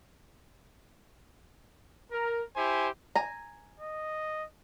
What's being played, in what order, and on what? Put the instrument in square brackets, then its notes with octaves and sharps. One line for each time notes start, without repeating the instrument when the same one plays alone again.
[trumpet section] A#4
E4 G4 C5 G#5
[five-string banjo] G#5 A#5
[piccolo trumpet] D#5